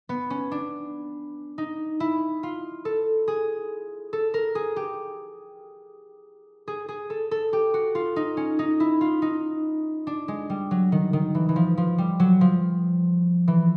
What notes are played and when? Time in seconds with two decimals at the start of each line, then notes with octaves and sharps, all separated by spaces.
0.09 B3
0.30 C#4
0.52 D4
1.58 D#4
2.00 E4
2.43 F4
2.85 A4
3.28 G#4
4.13 A4
4.34 A#4
4.55 G#4
4.76 G4
6.68 G#4
6.89 G#4
7.10 A4
7.31 A4
7.53 G4
7.74 F#4
7.95 F4
8.16 D#4
8.37 C#4
8.59 D#4
8.80 E4
9.01 F4
9.22 D#4
10.07 D4
10.28 G#3
10.50 G3
10.71 F#3
10.92 D#3
11.13 D#3
11.35 E3
11.49 E3
11.56 F3
11.77 F3
11.98 G3
12.20 F#3
12.41 F3
13.48 E3